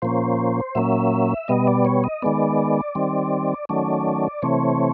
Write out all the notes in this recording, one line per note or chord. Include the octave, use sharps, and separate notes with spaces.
A#2 F3 A#3 C#4 C5
A#2 F#3 A#3 C#4 E5
B2 G3 B3 D#5
D5
C#5
D#5
D#3 G#3 B3 D5
D#3 G3 C4
D#3 F#3 A3 C#4 D5
C3 E3 A3 C4 C#5